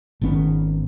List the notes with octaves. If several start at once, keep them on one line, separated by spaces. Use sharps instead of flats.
G#1 D#3 B3 C#4